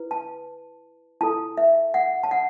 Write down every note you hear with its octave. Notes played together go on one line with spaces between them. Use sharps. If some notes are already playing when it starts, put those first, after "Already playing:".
Already playing: E4 B4
A5
E4 A4 A5
E5
F#5
A5
F#5